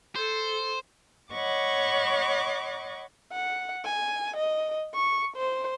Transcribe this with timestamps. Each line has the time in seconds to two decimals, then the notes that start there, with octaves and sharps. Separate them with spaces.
0.16 A4 C5
1.32 C#5 D#5 F#5 B5 C#6 D6
3.33 F#5
3.85 G#5
4.37 D#5
4.94 C#6
5.37 C5